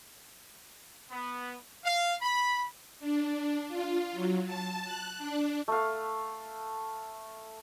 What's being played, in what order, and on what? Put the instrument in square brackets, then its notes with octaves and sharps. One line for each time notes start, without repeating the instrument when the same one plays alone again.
[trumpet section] B3
F5
B5
[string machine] D4
F4
F#3
A5
F#6
D4
[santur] A3 F5